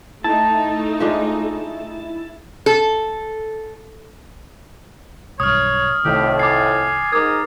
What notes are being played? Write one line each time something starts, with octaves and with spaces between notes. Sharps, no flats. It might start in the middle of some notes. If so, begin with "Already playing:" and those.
A3 D#4 E4 A5
F3 G#3 D4
A4
B1 G2 C#5 D#6 F6
C2 F2 A2 D#3 G4
G#5 D6 A6 C7
G#2 A#4 D6 D#6 G#6